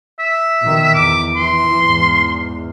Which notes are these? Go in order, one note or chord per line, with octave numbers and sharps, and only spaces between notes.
E5
B2 D#3
E2 D6
E3 C6
E2 G#2